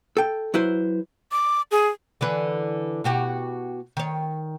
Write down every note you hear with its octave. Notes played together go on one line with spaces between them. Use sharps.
A4 G5
F#3 E4 B4 C5
D6
G#4
D3 E3 B4
B2 F#4 G4
D#3 C#5